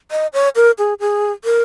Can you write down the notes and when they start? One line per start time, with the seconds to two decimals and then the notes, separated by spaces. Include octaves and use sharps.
0.11 D#5
0.33 C#5
0.56 A#4
0.78 G#4
1.00 G#4
1.45 A#4